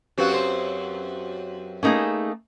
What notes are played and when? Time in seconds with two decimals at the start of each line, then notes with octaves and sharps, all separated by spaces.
0.18 F#2 C4 F#4 G4 B4 F5
0.34 C5
1.83 A3 A#3 C#4 D#4 G#4